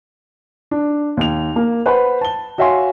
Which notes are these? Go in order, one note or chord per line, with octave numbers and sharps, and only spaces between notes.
D4
D#2 F7
A#3
B4 C5 F#5 B5
A5 G7
F#4 C#5 E5 F5 G#5 C6